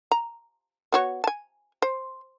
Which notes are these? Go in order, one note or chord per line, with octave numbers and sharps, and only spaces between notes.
A#5
B3 F#4 C#5
G#5 A5
C5